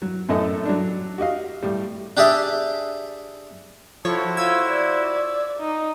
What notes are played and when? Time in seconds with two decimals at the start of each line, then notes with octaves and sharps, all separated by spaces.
0.02 F#3
0.29 F#2 A2 A3 C#4 A4 D#5
0.65 F#3 D4
1.18 F#4 G4 D#5 F5
1.63 A2 G3
2.17 D4 G4 G#4 D5 E5
4.05 F3 E4 F#4 A4 C5 C#5
4.37 F4 E6 G#6
4.70 D5
5.59 D#4